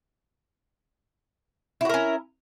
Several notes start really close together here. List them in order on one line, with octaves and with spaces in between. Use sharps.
E4 F#4 A#4 C#4